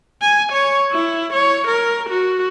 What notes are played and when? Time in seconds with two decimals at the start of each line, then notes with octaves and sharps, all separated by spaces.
0.22 G#5
0.52 C#5
0.92 E4
1.33 C#5
1.67 A#4
2.09 F#4